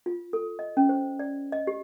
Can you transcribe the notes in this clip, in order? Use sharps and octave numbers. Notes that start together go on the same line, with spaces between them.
F4
A4
D#5
C#4
C5
D5
D#5
G4